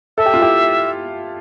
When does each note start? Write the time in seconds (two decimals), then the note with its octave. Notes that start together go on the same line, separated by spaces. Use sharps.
0.18 A4 E5
0.26 G4
0.34 F4
0.41 E4 G4